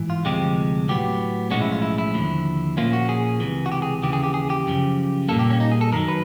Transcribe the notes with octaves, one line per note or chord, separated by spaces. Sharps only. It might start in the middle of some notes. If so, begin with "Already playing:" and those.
Already playing: G#2 E3
F4
D2 C3 F3 G#3 G4
A2 F#3 B3 G4
B1 A2 F3 G#3 C#4 F#4
E4
F4
E4
E4
D#2 D3 F3
A#2 F3 A#3 C#4 F4
F#4
G#4
C#2 C3 E3
F#4
G4
G#4
D#2 C#3 E3 G4
G#4
G4
G#4
G4
F#2 C#3 F3
A#2 G3 A#3 A4
G4
C#4
D#4
G#4
A4
F#2 D#3 F#3 A#4
B4